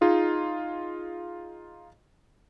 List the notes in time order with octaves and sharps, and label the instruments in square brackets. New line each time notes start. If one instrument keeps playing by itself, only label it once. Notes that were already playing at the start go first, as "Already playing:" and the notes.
[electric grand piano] D#4 F4 G#4 D#5